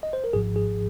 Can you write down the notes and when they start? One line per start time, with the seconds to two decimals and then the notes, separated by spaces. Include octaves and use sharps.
0.03 D#5
0.13 C5
0.24 A#4
0.33 G#1 G#2 F3 G#4
0.56 G#4